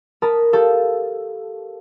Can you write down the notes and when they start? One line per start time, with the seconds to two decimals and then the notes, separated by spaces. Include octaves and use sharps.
0.22 A#4 A5 B5 D#6
0.53 G4 A4 F5